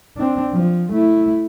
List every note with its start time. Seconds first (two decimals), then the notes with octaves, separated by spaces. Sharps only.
0.17 C4 D4
0.53 F3
0.92 A3 E4